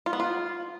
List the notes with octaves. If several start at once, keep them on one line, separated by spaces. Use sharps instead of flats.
F4
B3
F4